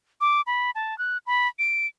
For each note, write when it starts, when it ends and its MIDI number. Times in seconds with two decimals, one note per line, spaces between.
0.21 0.41 86
0.47 0.71 83
0.75 0.97 81
0.98 1.18 90
1.27 1.48 83
1.59 1.87 98